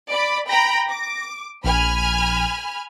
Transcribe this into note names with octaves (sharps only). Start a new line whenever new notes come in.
D5 B5
G5 A#5 B5 A#6
D6
A#1 G#5 B5 F6